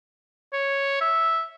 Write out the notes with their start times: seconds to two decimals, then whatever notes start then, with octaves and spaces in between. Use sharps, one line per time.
0.53 C#5
1.01 E5